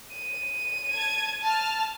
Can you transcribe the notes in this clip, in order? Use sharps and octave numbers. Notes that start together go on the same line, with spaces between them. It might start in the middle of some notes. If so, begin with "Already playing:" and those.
D#7
A5 G#6
A5 F6